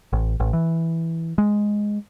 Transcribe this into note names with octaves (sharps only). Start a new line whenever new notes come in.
A1
A1
E3
G#3